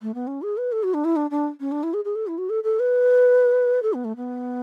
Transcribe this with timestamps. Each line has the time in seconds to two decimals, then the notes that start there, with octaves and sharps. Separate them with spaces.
0.02 A3
0.15 B3
0.27 C#4
0.42 G#4
0.57 B4
0.72 A4
0.83 F#4
0.94 D4
1.05 E4
1.16 D4
1.31 D4
1.60 C#4
1.72 D4
1.83 E4
1.94 G#4
2.05 G#4
2.15 A4
2.27 E4
2.38 F#4
2.50 A4
2.64 A4
2.80 B4
3.83 A4
3.94 B3
4.05 A3
4.16 B3